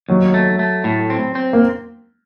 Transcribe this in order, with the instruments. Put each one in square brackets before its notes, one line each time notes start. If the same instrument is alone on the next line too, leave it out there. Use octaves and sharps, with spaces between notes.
[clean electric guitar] D#2 [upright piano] F#3
[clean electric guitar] A3
A3
A2
C4
C4
[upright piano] A#3